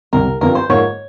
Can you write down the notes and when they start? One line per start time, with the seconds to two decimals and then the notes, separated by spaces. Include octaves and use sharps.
0.13 C2 C3 G3 A#4
0.41 G2 F3 C4 A#4
0.55 C5
0.69 G#2 F3 A#3 C#5